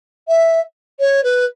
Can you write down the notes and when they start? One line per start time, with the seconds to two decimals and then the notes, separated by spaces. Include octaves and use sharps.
0.28 E5
0.99 C#5
1.24 B4